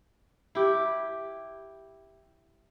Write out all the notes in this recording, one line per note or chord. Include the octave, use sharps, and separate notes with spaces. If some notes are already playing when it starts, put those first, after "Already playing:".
E4 G4